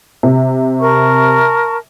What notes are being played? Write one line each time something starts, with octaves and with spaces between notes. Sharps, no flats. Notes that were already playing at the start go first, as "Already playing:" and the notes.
C3
A#4 A5 C#6